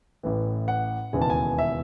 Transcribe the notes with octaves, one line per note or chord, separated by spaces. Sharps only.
A1 A2 E3
F#5
E1 D#2 C#3 E3 G#5
A5
G#5
E5